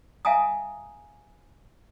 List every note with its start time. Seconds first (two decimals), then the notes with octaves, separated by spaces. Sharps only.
0.25 E5 F5 G#5 A#5 D#6